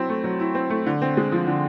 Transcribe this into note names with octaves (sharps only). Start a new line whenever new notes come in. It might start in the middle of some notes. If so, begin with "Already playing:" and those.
Already playing: F#3 C4 E4
A3
F#3
E4
C4
A3
D3
C4
G#3
F3
D3